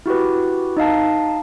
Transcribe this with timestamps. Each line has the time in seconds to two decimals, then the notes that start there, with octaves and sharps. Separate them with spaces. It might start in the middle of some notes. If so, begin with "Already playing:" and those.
0.06 E4 F#4 G4 B4
0.77 D#4 D#5 F5 A5